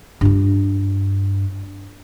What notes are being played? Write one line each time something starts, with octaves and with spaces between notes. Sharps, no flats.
G2 F4